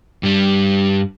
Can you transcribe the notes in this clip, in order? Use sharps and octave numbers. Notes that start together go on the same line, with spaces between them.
G2 G3